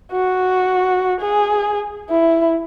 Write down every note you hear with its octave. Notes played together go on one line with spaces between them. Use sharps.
F#4
G#4
E4